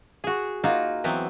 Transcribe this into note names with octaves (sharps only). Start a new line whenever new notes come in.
F#4 G#4
A#3 D#4 F4 F#4
E3 F#3 B3 C4